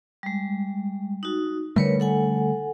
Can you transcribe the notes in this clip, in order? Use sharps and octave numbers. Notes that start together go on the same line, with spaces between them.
G3 G#3
D#4 F#4
D3 G3 A3 A#4 B4 C#5
A4 F#5 G#5